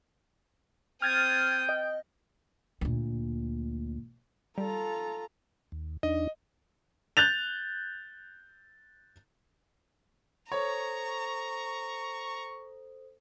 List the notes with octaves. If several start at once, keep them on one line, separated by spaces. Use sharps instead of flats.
C4 G5 D#6 F6 G#6 A6
D#5
D2 A#2
G3 F4 A4 A#5
D#2
E2 D4 D#4 D#5
F#6 G6 A6 F7
A4 C5 C#5 A#5 C#6 D#6